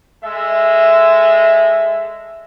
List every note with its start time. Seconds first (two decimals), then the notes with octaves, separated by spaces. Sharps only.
0.24 G#3 A4 E5